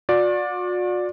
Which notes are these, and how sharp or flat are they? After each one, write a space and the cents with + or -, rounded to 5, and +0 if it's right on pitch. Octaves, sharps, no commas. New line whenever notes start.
F#4 -45 D5 +0